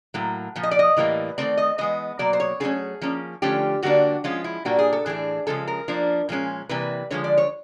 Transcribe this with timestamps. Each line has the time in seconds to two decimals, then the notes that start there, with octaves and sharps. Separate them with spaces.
0.14 A2 F#3 A#3
0.56 A#2 F3
0.63 D#5
0.71 D5
0.79 D#5
0.97 A2 E3 G3 A#3
1.38 D#3 F#3 A3 C4 D5
1.57 D#5
1.78 E3 G#3 B3 D#5
2.19 B2 F#3 A#3 D5
2.33 C5
2.40 C#5
2.60 D3 F#3 A3 C#4 G#4
3.02 F3 A#3 C#4
3.42 D3 F3 A3 C#4 G4
3.83 D3 G3 A#3 D4 F#4
4.24 F3 G#3 C#4 F4
4.44 E4
4.65 A#2 G3 A#3 D4 F#4
4.79 G#4
4.93 A4
5.06 A2 E3 A3 D4 G#4
5.47 C#3 F3 G#3 C#4 A4
5.67 A#4
5.88 F3 A#3 D4
6.29 A#2 F3 G#3 C#4
6.69 C3 E3 G3 A#3 B4
7.11 D3 F3 G#3 C#5
7.24 D5
7.37 C#5